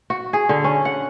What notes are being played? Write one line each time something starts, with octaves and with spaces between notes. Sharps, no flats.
F#4
G#4
D3
C#4
F#5